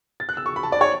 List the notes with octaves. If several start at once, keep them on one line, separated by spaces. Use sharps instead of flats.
A6
F#6
E6
C#6
B5
A5
D5
C#5